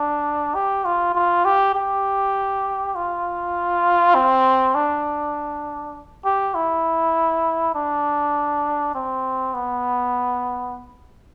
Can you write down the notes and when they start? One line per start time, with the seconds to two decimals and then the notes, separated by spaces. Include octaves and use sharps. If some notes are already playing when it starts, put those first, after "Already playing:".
Already playing: D4
0.55 G4
0.85 F4
1.15 F4
1.45 G4
1.75 G4
2.95 F4
4.15 C4
4.75 D4
6.25 G4
6.55 E4
7.75 D4
8.95 C4
9.54 B3